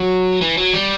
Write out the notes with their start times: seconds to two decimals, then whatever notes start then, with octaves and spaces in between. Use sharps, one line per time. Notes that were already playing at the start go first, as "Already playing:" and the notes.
Already playing: F#3
0.41 E3
0.57 F#3
0.73 G3